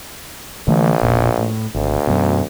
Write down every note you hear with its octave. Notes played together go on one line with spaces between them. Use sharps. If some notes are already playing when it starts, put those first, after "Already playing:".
A#1 D3 E3 A3
E1 A#2
A2
G#1 D2
F#2 B2